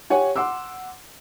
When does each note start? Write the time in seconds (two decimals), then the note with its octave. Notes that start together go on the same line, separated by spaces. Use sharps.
0.10 G4 C#5 F#5 G#5
0.36 F#5 C6 D6 E6